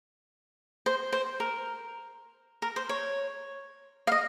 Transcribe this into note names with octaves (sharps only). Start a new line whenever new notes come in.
C5
C5
A#4
A#4
C5
C#5
F5
D#5